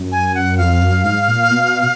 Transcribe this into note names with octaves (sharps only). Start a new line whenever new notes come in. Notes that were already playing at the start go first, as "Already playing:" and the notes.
Already playing: F#2
G#5
F#5
F2 F5
F#2
G#2
A#2
B2